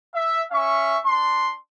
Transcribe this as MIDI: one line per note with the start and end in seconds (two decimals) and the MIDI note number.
0.14 0.41 76
0.52 0.97 61
0.52 0.97 76
0.52 0.97 85
1.06 1.53 62
1.06 1.53 84